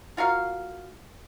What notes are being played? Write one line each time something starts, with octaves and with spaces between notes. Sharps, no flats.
F4 F#4 A#4 F5